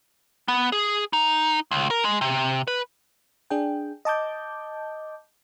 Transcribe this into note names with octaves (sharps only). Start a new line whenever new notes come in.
B3
G#4
D#4
C#2
A#4
G#3
C3
B4
D4 G#4 G5
D#5 A5 D6 G6